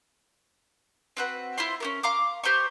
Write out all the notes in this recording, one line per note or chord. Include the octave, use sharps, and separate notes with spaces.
C4 F#4 B4
E4 F4 C5 C6
C#4 F#4 A#4
F5 A#5 C6 D6
G4 C5 A#5 C#6